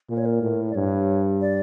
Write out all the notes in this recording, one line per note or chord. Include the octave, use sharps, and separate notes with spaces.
A#2 A#4
C#5
A#4
A2
D5
G2 C#5
D5